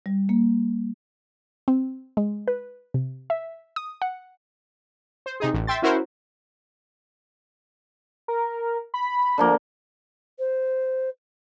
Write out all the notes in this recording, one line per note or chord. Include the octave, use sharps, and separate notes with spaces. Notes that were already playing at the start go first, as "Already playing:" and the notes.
G3
A#3
C4
G#3
B4
C3
E5
D#6
F#5
C5
C3 D#4 G#4
A1
E5 G5 C6 A6
C#4 E4 F#4 A#4 C5
A#4
B5
D3 F3 A#3
C5